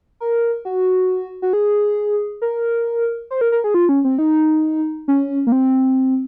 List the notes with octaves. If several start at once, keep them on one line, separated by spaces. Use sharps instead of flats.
A#4
F#4
F#4
G#4
A#4
C5
A#4
A#4
G#4
F4
C#4
C4
D#4
C#4
A#3
C4